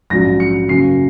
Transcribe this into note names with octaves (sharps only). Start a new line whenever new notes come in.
A#1 G#2 F#3 C#4 A#6
C#7
F#2 C#3 F#3 A#3 C#4 C7